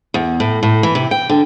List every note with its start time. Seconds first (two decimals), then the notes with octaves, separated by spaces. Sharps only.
0.14 E2
0.40 A2
0.63 A2
0.83 E3
0.95 C3
1.11 G5
1.29 D3